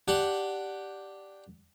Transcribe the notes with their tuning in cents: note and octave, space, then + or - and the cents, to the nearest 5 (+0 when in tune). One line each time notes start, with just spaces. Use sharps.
D4 +0 G4 +0 F#5 +0